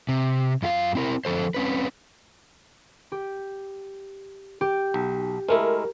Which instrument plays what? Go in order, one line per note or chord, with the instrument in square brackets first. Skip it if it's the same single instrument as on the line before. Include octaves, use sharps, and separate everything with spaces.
[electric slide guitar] C3
F#2 F4 G4 F5
C4 E4 A#4
D3 F3 A4 C5
C4 C#4 B4
[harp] G4
G4
[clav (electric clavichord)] B1
[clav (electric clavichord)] G#3 A3 E4 [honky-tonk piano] A#4